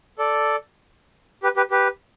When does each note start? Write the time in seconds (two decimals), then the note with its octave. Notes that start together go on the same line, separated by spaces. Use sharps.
0.18 A4 D5
1.43 G4 B4
1.57 G4 B4
1.71 G4 B4